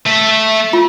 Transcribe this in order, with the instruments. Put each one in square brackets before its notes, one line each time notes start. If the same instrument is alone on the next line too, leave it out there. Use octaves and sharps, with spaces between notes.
[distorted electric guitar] A3 E5
[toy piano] F4